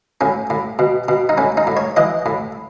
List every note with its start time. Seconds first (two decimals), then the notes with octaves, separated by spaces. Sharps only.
0.21 A2 C#4
0.50 A2
0.79 B2
1.08 B2
1.29 D#4
1.38 A2 C#4
1.57 D#4
1.67 A2
1.77 C#5
1.96 E3 D#5
2.26 A2